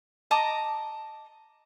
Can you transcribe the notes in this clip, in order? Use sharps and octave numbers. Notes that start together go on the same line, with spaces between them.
D#5 A5 A#5 D6